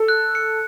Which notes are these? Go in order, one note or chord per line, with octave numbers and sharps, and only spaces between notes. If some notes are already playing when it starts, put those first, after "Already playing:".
Already playing: A4
F#6
C#7